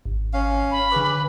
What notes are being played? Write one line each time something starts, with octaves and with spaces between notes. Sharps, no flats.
G#1
C#4 F5
B5
D3 G#4 B4 D6